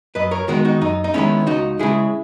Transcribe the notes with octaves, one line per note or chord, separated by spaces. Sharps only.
F#2 B4 D#5
A#4 C#5
D#3 G#3 B3 F#4 A#4
D#4 F#4
F#2 D#4
D#4
D#3 G#3 B3 C#4 E4
C#2 D#4 F#4
C#3 G#3 E4 G#4